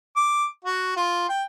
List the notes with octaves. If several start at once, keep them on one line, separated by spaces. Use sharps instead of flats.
D6
F#4
F4
G5